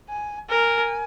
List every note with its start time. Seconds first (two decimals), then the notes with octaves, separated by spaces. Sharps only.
0.09 G#5
0.50 A#4 G#5